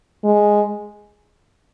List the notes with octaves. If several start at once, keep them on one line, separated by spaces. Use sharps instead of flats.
G#3